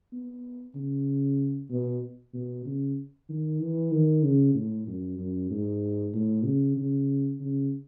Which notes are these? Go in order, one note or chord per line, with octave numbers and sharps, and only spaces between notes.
B3
C#3
B2
B2
C#3
D#3
E3
D#3
C#3
A2
F#2
F#2
G#2
A2
C#3
C#3
C#3